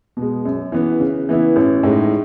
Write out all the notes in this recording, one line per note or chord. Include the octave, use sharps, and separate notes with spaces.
B2 G#3
F#2
E3 B3
C#3
E3 B3 E4
A1
A2 G#3 D#4